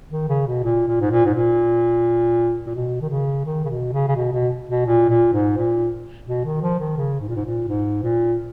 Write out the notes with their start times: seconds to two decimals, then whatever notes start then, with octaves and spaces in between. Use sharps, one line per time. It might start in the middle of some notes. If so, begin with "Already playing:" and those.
0.10 D#3
0.29 C#3
0.47 B2
0.64 A#2
0.87 A#2
1.01 G#2
1.11 A#2
1.25 G#2
1.34 A#2
2.67 A#2
2.75 B2
3.01 D#3
3.10 C#3
3.45 D#3
3.65 C#3
3.69 B2
3.93 C#3
4.08 C#3
4.16 B2
4.33 B2
4.69 B2
4.86 A#2
5.09 A#2
5.33 G#2
5.57 A#2
6.27 B2
6.45 D#3
6.62 F3
6.79 D#3
6.97 C#3
7.21 G#2
7.28 A#2
7.36 G#2
7.45 A#2
7.68 G#2
8.03 A#2